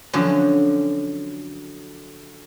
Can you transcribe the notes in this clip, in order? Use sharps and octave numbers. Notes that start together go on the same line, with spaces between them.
D3 F3 F#3 C#4